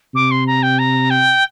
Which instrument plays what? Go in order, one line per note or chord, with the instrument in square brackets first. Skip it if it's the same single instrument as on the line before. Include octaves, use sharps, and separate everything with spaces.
[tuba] C3 [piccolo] D6
[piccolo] C6
A#5
G5
A#5
G5